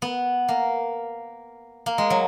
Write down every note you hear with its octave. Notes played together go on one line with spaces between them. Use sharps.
B3
A#3
A#3
G#3
F#3